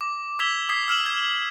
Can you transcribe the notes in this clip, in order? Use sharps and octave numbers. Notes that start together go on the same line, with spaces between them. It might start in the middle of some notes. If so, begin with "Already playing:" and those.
D6
D6 E6 G#6 B6 F7 G7
D#6 G#6 B6 C7
E6 F6 E7 F#7
G#6